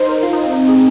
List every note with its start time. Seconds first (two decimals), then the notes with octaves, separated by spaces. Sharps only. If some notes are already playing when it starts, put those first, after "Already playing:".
Already playing: D#4 C5
0.09 A#4
0.23 F4
0.33 D#4
0.43 C4
0.53 D#4
0.69 G#4